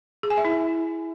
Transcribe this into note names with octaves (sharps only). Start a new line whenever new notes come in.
G#4
G#5
E5
E4